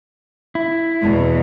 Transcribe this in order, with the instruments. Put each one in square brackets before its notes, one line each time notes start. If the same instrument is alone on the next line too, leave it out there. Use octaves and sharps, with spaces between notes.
[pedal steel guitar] E4
[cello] E2 B2